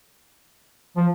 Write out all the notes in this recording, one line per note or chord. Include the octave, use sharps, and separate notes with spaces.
F3